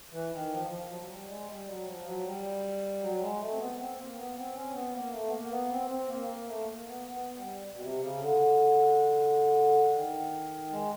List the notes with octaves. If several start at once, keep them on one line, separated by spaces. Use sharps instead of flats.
E3
D#3
F3
F3
F#3
F#3
G3
G#3
G3
F#3
F3
F#3
G3
F#3
G#3
A3
C4
B3
C4
A#3
B3
C4
C#4
C4
B3
A#3
A3
B3
A#3
B3
C4
C4
A#3
A#3
A3
A#3
B3
B3
G3
B2
C3
C#3
D3
D#3
G#3